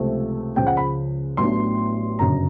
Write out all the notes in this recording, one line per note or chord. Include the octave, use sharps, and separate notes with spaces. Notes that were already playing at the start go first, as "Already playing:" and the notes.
Already playing: C#2 C3 F3 A3
C#2 C#3 F3 G#3 G5
F#5
B5
A1 A2 F#3 B3 D4 C6
G1 F#2 C#3 A#5